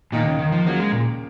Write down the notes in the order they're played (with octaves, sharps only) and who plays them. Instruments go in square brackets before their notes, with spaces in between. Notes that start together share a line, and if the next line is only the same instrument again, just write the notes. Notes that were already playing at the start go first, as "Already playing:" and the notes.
[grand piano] D#2 D#3 A#3 D#4 [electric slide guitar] A#2
[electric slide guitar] C#3
D#3
F3
[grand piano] C#3 F3 A#3 [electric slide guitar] F#3
[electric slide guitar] G#3
A#2